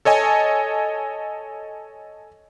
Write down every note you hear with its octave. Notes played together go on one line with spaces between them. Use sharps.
A4 C#5 D#5 G#5 A5